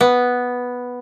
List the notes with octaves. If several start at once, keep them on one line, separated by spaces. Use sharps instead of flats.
B3